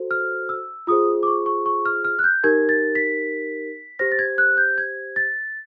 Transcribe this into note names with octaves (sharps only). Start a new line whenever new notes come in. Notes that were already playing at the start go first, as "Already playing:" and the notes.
Already playing: F#4 A4 C5
F6
E6
F4 G#4 C5 D#6
D6
C#6
C#6
C#6
F6
F6
F#6
G6
D#4 G4 A#4 G#6
A6
B6
G4 C5 A#6
A6
G#6
F#6
G6
G#6
A6